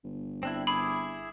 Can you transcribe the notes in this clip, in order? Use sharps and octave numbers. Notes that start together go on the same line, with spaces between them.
G1
C4 D4 E4
E4 G#4 B5 D6